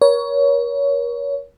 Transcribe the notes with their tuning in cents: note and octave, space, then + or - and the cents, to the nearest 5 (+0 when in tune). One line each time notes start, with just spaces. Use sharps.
A#4 +40 C#5 +20